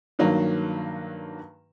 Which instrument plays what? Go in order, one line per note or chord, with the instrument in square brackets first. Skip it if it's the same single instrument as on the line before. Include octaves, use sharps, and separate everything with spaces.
[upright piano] G2 D#3 F#3 A#3